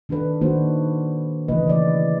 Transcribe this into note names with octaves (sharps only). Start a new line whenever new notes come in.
D#3 D4 A4 B4
D#3 A#3 D4 F#4 C5
C#3 E3 A3 A#3 B4 D#5
E3 D5